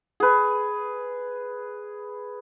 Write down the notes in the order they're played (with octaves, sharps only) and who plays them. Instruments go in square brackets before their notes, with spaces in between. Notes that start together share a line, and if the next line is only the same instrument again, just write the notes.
[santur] G#4 B4